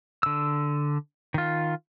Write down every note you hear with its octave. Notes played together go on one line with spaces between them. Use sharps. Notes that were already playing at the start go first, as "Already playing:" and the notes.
D3 E6
D#3 F4